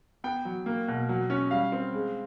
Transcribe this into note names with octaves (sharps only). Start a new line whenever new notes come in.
B3 G5
F#3
A#3
B2
F#3
C#4
G3 F5
C4
G#3